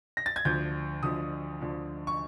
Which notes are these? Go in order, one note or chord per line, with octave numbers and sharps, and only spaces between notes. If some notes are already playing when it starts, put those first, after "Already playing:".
A#6
A6
G#6
D2 D3 F3 G6
D2 D3 F3 D#6
D2 D3 F3
C#6